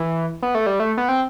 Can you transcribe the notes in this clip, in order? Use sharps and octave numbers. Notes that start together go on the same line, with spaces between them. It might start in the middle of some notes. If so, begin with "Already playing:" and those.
Already playing: E3
B3
A3
G3
A3
B3
C4